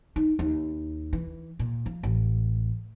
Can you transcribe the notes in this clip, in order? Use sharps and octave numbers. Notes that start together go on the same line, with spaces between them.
D#4
D#2
E3
A#2
F3
A1